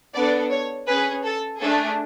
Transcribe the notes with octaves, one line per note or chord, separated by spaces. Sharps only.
B3 D4 A4 D5
C#5
C#4 G#4 B4
A4
A3 D4 G#4 A4